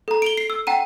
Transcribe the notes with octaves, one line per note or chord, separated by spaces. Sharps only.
A4 A#5
D7 F7 G7
C7
E6
F#5 G5 A#5 D#7